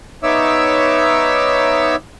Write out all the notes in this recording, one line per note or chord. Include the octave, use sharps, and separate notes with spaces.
B3 D#4 C#5 E5 D6 E6